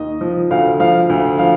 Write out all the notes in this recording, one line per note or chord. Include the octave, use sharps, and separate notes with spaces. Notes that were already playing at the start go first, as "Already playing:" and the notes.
Already playing: D#2 D#3 D#5
F3
D2 F5
F3 F5
D2
F3 F5